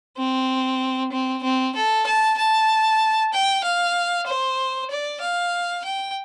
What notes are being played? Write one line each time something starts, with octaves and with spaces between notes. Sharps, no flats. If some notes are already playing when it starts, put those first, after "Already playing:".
C4
C4
C4
A4
A5
A5
G5
F5
C5
D5
F5
G5